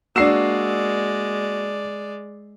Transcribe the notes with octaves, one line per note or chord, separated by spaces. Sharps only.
G#3 A#3 D4 F#4 D5 E6 C7 E7